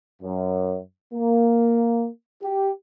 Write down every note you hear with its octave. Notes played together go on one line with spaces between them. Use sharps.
F#2
A#3
G4